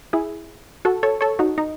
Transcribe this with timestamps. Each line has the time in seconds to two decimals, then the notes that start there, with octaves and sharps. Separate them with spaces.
0.13 E4 G#4
0.85 F#4 A4
1.03 A4 C#5
1.21 A4 C#5
1.39 D#4 F#4
1.58 D#4